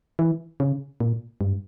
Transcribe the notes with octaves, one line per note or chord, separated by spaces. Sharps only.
E3
C#3
A#2
G2